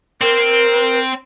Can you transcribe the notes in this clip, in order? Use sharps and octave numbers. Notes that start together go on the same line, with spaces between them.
C4 A#4